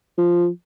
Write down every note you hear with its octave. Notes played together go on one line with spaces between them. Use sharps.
F3